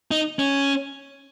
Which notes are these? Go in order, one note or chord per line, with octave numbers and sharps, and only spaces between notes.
D#4
C#4